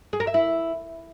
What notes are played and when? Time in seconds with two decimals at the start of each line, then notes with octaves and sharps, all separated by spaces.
0.13 G#4
0.20 A#4
0.27 E5
0.34 E4